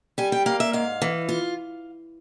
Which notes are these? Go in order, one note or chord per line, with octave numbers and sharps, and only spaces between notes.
G3 G#5
G5
A#3 F5
E5
G#2 F5
E3
F4